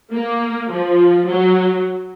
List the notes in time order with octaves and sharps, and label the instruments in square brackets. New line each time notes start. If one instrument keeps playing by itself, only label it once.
[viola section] A#3
F3
F#3